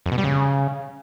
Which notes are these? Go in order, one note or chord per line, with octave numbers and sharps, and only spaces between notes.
F2
B2
G3
C#3